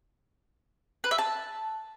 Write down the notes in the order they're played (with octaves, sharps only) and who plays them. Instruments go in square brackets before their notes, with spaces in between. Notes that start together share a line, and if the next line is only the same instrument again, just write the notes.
[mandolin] B4
E5
A5